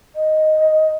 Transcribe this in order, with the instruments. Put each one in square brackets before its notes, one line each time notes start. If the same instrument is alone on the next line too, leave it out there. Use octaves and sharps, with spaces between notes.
[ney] D#5